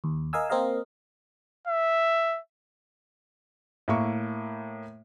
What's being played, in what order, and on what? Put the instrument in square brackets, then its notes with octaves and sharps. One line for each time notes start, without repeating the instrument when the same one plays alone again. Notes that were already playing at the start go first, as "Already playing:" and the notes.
[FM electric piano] D#2
A#4 D#5 F5 G#5 E6
A#3 C4 A#4 D#5 F5
[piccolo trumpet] E5
[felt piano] A2 A#3 C#6